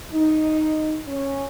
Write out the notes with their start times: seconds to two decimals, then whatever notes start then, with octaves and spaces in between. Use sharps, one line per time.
0.12 D#4
1.07 C#4